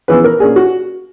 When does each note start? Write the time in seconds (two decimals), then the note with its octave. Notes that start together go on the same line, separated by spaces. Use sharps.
0.08 C#3 E3 B3 B4
0.24 A#4
0.40 A#2 A#3 C#4 G#4
0.56 F#4